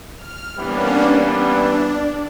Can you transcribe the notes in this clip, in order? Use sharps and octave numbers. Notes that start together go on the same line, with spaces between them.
F6
E3 G3 A#3 B3 C#4 D4
D4